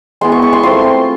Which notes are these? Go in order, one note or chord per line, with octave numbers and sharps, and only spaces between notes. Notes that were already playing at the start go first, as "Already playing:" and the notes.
G#3 B3 E4 C6
C#6
C#6
C6
A3 C4 F4 C6